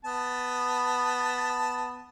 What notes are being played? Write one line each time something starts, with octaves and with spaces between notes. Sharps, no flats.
B3 A5